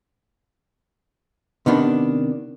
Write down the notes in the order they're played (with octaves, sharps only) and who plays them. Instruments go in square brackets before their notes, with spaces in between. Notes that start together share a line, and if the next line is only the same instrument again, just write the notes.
[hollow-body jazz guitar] C3 D#3 B3 D4